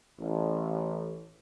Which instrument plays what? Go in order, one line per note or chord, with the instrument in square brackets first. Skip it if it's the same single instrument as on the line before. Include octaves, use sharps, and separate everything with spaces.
[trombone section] A1